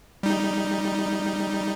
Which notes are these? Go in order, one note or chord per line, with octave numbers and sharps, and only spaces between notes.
G3 D#4